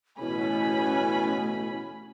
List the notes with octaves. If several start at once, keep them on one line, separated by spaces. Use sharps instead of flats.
A1 D2 B2 A3 C#4 E4 G#5 B5